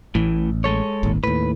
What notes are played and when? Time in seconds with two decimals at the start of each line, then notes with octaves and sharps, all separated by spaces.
0.15 A1 A2 E3
0.64 G#3 A4 C#5
1.03 D#1 G#1 D#2
1.24 D#2 A2 B4